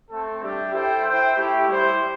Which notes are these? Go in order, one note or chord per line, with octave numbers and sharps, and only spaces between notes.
A3 C4 A4
G3 D4 G4 E5
E4 A4 C5 G5
E4 C5 E5 G5
A3 E4 G4
G3 E4 C5